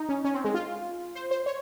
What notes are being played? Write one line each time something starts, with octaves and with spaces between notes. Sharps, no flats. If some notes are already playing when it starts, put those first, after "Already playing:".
Already playing: D#4
C#4
C#4
C4
G#3
F4
C5
C5
C#5